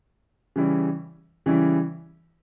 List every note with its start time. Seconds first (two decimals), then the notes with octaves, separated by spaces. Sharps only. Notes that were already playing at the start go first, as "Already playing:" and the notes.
0.56 C#3 E3 G3 C#4 E4
1.46 C#3 E3 G3 C#4 E4